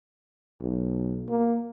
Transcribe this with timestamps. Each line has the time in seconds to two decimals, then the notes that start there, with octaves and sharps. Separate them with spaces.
0.61 B1
1.29 A#3